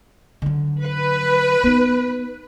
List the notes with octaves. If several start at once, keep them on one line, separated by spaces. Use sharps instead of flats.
D3 F#3
B4
B3 D#4